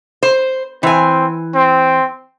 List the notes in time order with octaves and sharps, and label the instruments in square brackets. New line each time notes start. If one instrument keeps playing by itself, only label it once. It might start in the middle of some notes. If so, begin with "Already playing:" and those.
[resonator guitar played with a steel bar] C5
[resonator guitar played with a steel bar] E3 G#5 [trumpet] C4
[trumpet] C4